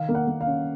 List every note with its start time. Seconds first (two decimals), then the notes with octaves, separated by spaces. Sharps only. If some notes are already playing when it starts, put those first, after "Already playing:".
Already playing: D#3 F5
0.09 A#3
0.15 F#5
0.27 A#3
0.41 F5
0.46 C#4